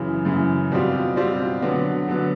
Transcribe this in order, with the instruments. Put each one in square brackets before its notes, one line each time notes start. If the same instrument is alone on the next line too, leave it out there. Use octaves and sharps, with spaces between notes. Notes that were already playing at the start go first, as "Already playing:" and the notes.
Already playing: [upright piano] F#2 C#3 E3
F#2 C#3 E3
B2 G3 C4 F4
B2 G3 C4 F4
D3 F#3 B3
D3 F#3 B3